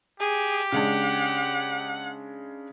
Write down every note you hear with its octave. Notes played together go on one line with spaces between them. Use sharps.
G4 G#4
C#3 G#3 D4 F#5